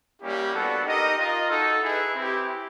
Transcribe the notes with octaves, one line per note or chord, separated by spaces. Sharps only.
G3 A#3 C#4 E4 G4
B3 D4 F#4 A4
D#4 G4 A#4 D#5
F4 A#4 D#5
D#4 F#4 A4
E4 G#4 B4
C4 E4 G4